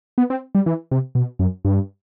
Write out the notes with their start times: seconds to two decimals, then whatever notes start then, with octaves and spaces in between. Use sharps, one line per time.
0.18 B3
0.30 C4
0.55 G3
0.66 E3
0.91 C3
1.15 B2
1.39 F#2
1.65 G2